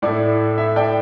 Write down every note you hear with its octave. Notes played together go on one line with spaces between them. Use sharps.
A2 A3 E4 D5
E5
D5 G5